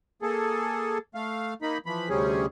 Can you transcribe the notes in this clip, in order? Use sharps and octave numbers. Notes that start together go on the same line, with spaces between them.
A#3 G#4 A4
A3 F5
A#3 D#4 B5
E3 F3 B5
D2 C3 G3 C#4 G#4